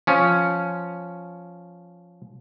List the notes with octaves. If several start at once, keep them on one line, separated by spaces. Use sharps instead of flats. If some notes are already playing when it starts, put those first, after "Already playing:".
F3 C#4